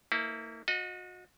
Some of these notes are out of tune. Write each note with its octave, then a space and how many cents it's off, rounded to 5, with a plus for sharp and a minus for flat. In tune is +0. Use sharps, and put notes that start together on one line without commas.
A#3 -35 E4 -25 B4 +0
F#4 -35 D#5 +0